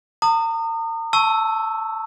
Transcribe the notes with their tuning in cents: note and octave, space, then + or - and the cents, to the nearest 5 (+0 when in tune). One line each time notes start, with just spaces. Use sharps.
A#5 -40 D#6 -25
A5 +5 C#6 -10 E6 +0